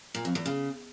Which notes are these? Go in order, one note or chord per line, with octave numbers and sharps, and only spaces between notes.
A#2
F2
E2
C#3